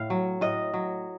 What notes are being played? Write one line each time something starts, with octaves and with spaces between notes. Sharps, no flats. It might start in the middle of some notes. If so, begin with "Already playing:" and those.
Already playing: A2 F5
F#3
A2 D#5
F#3